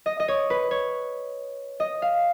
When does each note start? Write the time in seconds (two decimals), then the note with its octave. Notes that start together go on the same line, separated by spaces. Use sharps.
0.06 D#5
0.20 D#5
0.28 C#5
0.50 B4
0.71 C#5
1.80 D#5
2.02 F5